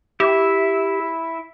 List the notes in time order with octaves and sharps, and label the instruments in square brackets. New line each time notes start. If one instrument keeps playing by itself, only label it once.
[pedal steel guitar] E4 E5 [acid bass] G4